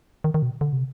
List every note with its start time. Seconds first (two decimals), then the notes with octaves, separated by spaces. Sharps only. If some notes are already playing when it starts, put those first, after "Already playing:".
0.24 D#3
0.34 D#3
0.42 B2
0.61 D3
0.73 C3